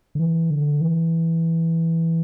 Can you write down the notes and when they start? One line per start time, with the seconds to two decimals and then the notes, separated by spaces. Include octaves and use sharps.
0.15 D3
0.19 E3
0.50 D3
0.81 E3